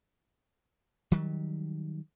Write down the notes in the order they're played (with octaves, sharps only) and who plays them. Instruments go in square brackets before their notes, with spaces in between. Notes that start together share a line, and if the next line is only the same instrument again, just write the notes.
[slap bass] D#3 F#3 G3